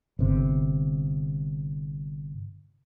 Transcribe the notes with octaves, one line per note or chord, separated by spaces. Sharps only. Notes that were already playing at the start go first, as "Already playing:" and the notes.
G1 C3